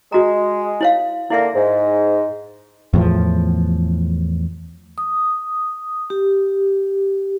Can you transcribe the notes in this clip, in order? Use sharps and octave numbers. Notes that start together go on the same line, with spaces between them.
G#3 F#4 A#5
E4 C#5 F5
D3 A#3 E4 E5
G#2
E2 A2 F3
D#6
G4